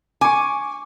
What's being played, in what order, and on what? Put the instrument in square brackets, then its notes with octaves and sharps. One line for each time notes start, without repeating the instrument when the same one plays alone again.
[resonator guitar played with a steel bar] G#5 [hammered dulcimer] C#6 D6